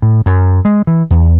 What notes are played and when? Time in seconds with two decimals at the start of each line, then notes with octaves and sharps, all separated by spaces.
0.02 A2
0.26 F#2
0.65 G#3
0.87 E3
1.11 E2